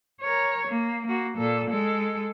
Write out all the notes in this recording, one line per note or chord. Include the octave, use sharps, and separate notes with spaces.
A#4 C#5
A#3
A#3 F#4
A#2 A4
G#3 A4